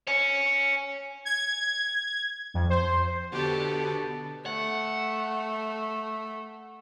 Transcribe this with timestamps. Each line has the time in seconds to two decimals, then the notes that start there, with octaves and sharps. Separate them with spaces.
0.07 C#5 G#5
1.25 G#6
2.54 F2
2.70 C5
3.32 B2 D3 B3 G4 A4
4.46 A3 F#5